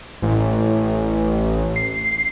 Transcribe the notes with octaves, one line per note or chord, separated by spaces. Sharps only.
A1
C7